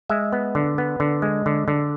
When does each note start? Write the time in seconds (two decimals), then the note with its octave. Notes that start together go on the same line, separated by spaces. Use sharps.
0.09 G#3 E5
0.33 B3
0.55 D3
0.78 B3
1.00 D3
1.22 G#3
1.46 D3
1.68 D3